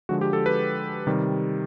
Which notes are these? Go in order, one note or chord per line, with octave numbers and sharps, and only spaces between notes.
D3 F3 G#3 F#4
G4
A4
B4
C3 D#3 G3